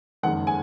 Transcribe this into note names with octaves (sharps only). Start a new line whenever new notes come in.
F#1 F2 D#3 G#3 F#5
G#5